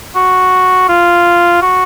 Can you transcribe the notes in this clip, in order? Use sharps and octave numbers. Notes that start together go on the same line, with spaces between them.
F#4
F4
F#4